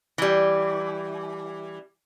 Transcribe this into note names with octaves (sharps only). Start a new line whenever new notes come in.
E3 G3